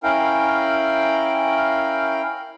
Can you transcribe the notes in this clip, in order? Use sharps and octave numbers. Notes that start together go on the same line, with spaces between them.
C#4 E4 A#4 F5 G5